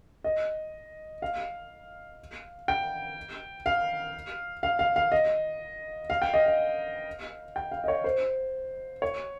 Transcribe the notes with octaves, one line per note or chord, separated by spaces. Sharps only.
D#5
F5
G5
F5
F5
F5
F5
D#5
F5
G5
D#5
F5
G5
F5
D#5
C#5
C5
C#5